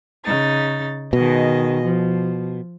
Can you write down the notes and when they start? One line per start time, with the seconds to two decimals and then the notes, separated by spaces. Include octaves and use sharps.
0.25 C#3 D#4 A6
1.13 B2 D#3 G#4 D#5
1.84 F3